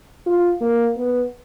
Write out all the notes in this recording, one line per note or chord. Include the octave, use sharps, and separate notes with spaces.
F4
A#3
B3